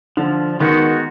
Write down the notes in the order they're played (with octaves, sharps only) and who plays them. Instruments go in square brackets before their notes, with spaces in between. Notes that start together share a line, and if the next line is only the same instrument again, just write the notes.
[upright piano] D3 [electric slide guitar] F3
[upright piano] D#3 [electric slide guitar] G#3 B3 D#4 F#4